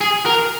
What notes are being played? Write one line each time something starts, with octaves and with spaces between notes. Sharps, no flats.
G#4
A#4